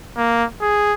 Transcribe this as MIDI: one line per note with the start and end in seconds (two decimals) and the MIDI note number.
0.17 0.44 58
0.61 0.93 68